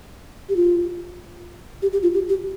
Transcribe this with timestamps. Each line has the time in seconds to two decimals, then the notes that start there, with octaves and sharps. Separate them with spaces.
0.49 G4
0.56 F4
1.82 G4
1.93 G4
2.03 F4
2.14 G4
2.29 G4